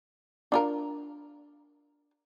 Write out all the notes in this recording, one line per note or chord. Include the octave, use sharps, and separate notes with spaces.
D4 F4 A#4